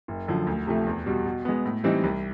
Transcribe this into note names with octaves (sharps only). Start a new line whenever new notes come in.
F#1
F#2 D3 F3
D2
C3 F3 A3
E2
B2 G3
B2
G#3 B3
A2
E3 G3 C4 D#4
C2